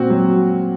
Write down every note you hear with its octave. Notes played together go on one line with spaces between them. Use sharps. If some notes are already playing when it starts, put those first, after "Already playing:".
Already playing: A#2 C4 F#4
F#3